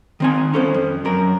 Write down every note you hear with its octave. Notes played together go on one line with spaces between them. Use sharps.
D#3 C4 G#5
C#4 A4 C5
F2
F#2 A#4